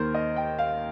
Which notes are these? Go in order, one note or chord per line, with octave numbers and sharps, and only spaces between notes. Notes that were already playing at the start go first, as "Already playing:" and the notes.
Already playing: D#2 D#3 A#4 C5
D#5
G5
F5